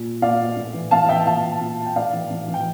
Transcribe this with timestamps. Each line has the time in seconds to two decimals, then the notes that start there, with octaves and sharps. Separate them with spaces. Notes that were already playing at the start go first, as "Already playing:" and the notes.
Already playing: A#2
0.22 A#2 D5 F5
0.57 A2
0.74 E3
0.91 A2 F5 A5
1.09 E3 E5 G5
1.27 A#2 F5 A5
1.61 A#2
1.86 G5
1.96 A2 D5 F5
2.13 E3
2.30 A2
2.48 E3
2.54 G5